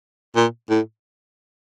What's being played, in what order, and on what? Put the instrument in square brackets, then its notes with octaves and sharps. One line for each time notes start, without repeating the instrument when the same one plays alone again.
[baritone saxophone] A#2
A2